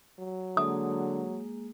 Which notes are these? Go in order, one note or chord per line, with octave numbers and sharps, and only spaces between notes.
F#3
D3 G#3 A#3 G#4 D#6